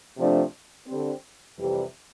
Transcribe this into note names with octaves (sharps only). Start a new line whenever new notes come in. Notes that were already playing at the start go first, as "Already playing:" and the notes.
C3 F3 A3 D4
D3 G3 C4
F2 C3 E3 G3